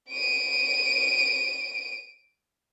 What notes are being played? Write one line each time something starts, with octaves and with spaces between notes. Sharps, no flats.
D7 D#7